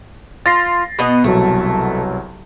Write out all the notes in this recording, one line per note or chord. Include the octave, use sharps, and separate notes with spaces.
F4 A6 A#6 C7
B2 B3 D#5
C2 B2 F#3 A3